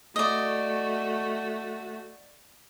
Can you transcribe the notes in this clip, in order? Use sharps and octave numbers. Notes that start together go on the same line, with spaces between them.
A3 F#4 D5 D#5